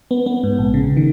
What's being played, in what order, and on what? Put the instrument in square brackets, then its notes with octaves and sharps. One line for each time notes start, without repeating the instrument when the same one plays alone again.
[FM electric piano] B3
B3
G#2
A#1
C#3
D#3